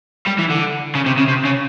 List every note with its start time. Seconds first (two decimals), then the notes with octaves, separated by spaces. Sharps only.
0.27 G3
0.39 E3
0.50 D3
0.95 C#3
1.06 C3
1.17 C#3
1.28 C3
1.45 C#3